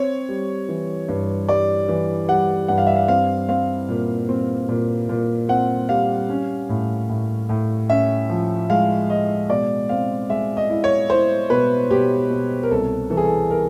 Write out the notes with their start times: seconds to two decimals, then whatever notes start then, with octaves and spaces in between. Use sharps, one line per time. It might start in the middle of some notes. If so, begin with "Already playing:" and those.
Already playing: C4 C#5
0.29 G3
0.69 E3
1.08 G2
1.48 G3 D5
1.89 E3
2.28 G3 F#5
2.68 G2 F#5
2.78 F5
2.87 E5
2.95 F5
3.08 C4 F5
3.48 C4 F5
3.89 A#2
4.29 C4
4.68 A#2
5.09 A#2
5.49 C4 F#5
5.89 G3 F5
6.30 C#4
6.69 A2
7.09 A2
7.49 A2
7.89 C#4 E5
8.30 F3
8.70 G#3 F5
9.10 G#3 D#5
9.50 B2 D5
9.89 C4 F5
10.29 G#3 E5
10.57 D#5
10.70 E4
10.84 C#5
11.10 E4 C5
11.50 B2 B4
11.90 B2 G4
12.30 B2
12.63 A#4
12.70 C2 A4
13.10 E3 A4
13.17 G#4
13.24 A4
13.51 A#4